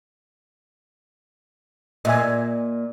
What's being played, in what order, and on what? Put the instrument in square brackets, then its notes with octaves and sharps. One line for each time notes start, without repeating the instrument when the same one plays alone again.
[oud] A#2 [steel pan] D#5 E5 G#5